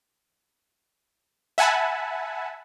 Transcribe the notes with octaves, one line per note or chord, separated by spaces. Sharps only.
E5 F#5 G#5 A5 B5